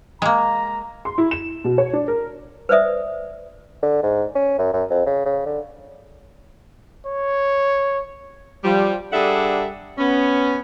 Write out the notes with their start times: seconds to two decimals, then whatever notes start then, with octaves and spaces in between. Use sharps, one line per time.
0.22 G#3 A#3 A#5
1.05 C6
1.18 E4
1.31 E7
1.64 B2
1.78 C#5
1.93 D4
2.08 A#4
2.69 B4 C5 D5 E5 D#6
3.83 D3
4.03 G#2
4.35 C#4
4.58 F#2
4.73 F#2
4.90 F2
5.06 C#3
5.25 C#3
5.46 D3
7.07 C#5
8.64 F3 G3
9.12 G3 D4 G#4 A4 E5 F#5
9.98 B3 C#4